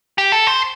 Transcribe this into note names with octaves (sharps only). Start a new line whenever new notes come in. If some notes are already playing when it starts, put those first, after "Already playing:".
G4
A4
C5